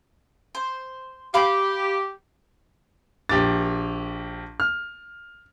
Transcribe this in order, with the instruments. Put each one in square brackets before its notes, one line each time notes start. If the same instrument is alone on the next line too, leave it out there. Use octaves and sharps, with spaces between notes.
[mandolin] C5
[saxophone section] G4 [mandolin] F5 B5 D6
[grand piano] A#1 G4 D6 A6
F6